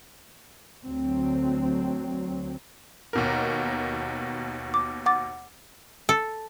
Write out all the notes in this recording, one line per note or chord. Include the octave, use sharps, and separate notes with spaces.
D2 F#3 C4
D#2 B2 A#4
D6
F#5 D6 A6
A4